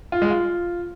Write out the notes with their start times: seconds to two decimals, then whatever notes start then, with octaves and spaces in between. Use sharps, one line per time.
0.12 F4
0.22 G#3
0.31 F4